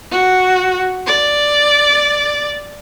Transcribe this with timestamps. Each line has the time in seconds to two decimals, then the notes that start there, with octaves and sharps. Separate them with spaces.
0.12 F#4
1.06 D5